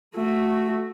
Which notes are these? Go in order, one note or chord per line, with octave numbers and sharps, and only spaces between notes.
A3 F#4